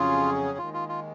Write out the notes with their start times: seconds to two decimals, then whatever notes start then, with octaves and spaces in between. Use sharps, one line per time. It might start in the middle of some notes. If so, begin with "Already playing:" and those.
Already playing: F2 C#3 F#3 C#4 F4 G#4
0.58 D#2 D#3 G#3 F4
0.74 F4
0.89 F4